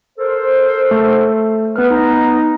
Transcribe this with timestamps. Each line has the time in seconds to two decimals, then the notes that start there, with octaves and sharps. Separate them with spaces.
0.18 A4 A#4 C5
0.91 A3
1.76 B3 B4 F6
1.91 D#4